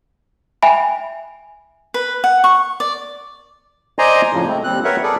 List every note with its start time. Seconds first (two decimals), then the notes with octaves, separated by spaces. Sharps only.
0.63 E5 G5 G#5 B5
1.94 B4
2.24 F#5
2.44 C#6
2.80 D5
3.99 C5 D5 D#5 G#5 A#5 C6
4.33 F2 A2 C#3 F3
4.48 G#3 A3 C4
4.64 D#2 G3 C4 F#6
4.84 A#4 B4 C#5 E5 F#5
5.03 G#4 A4 B4 D5